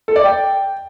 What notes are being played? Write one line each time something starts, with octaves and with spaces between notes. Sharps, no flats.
A4
D5
G5